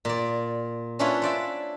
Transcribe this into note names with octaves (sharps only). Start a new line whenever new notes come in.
A#2 D5
C#4 D4 E4 F4 B4 C#5
C5 D5 E5